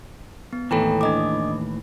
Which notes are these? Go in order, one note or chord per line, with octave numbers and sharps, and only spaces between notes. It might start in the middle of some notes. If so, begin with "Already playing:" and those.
B3
D#2 A2 E3 A4 G5 A#5
D4 D#5 D6